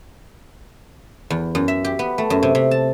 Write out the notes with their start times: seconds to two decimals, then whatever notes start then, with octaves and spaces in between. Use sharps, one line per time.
1.30 E2
1.55 F#2
1.68 E5
1.84 G4
1.99 B3
2.18 A3
2.30 F#2
2.43 C3
2.55 C3
2.71 A5